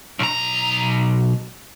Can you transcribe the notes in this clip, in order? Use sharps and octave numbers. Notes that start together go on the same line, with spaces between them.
B1 A#5